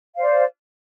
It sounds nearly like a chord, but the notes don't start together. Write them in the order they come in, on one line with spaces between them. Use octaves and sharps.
F5 C5 D5